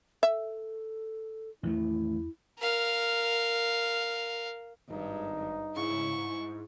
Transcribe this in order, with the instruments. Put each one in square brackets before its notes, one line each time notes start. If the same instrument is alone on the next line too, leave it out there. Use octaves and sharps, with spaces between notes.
[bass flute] A4 [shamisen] E5
[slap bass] A1 D#3 A3 [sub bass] E2 [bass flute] E4
[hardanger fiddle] A#4 F5
[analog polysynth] G#1 [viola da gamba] G2 [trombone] D#4
[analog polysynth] G#2 C#3 [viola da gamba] E4 [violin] C#6
[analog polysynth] G#2